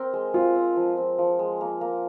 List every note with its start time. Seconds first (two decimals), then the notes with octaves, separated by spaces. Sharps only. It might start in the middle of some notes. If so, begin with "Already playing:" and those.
Already playing: C4 A#4
0.13 G#3
0.34 C4 F4
0.55 C4
0.76 F3
0.97 C4
1.18 F3
1.39 G#3
1.61 A#3
1.81 A#3